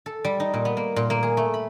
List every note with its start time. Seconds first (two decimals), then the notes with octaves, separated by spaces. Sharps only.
0.06 A4
0.25 G3
0.40 D#4
0.54 A#2
0.65 B3
0.77 A#3
0.96 A#2
1.10 A#3
1.23 G#4
1.37 A3
1.54 B5